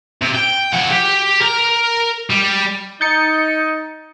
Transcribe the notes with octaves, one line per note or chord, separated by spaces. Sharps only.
C3
G5
F3 F#5
G4
A#4
G3
D#4 G6 A6 C#7